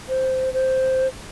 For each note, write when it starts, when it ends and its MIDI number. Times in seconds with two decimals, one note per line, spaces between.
0.09 0.52 72
0.53 1.07 72